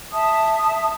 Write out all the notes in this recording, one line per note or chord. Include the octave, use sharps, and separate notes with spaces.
E5 A5 D#6